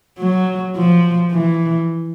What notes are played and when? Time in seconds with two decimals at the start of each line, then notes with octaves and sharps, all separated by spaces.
0.19 F#3
0.76 F3
1.32 E3